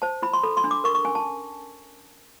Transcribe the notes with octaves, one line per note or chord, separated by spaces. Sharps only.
C5 A5
E4 B5
C6
A4 B5
C6
D4
D6
A#4 C#6
C#6
C#4 G#5
A5